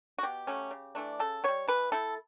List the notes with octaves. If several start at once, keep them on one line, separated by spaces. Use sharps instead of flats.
F#4
B2 G4
F#3 A3 C#4
C#3
E3 A3 D4
C#3 A4
G3 B3 C#5
E3 B4
A3 E4 A4